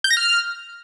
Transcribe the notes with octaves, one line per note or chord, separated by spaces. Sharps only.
G6
A#6
F6